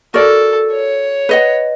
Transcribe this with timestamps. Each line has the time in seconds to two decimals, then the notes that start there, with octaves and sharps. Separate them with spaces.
0.14 F#4 A4 A#4 D5
0.72 C#5
1.29 B4 D#5 F#5